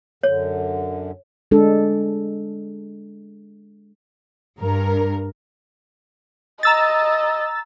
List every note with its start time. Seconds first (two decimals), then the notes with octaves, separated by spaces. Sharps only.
0.23 F#2 D3 C#5
1.51 G#3 D4 A4
4.59 G2 A#4
6.63 D#5 A#5 E6 A6